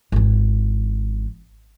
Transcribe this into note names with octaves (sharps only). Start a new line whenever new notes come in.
G#1 E3